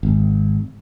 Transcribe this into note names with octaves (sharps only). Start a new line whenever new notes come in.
G#1